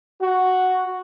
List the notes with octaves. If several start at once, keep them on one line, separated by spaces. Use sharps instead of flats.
F#4